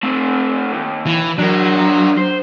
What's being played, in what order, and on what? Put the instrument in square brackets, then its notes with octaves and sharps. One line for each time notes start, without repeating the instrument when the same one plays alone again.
[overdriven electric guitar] A3 C4
D#2
[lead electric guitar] E3
[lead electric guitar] F#3 [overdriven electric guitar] D4 A#4
[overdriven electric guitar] C5